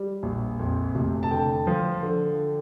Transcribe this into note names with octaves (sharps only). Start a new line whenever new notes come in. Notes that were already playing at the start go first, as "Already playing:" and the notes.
Already playing: G3
A#1
F2
F1
A5
D3 G5
F3
D3